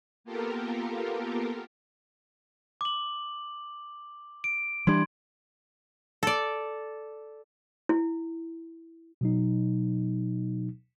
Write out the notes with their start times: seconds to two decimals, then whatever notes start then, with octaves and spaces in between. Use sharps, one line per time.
0.24 A#3 B3 F4 G4 A4 A#4
2.81 D6 F#7
4.44 D7
4.87 E3 G3 D4 C6 G#6
6.23 A4 D5
7.89 E4
9.21 B2 F#3 D#4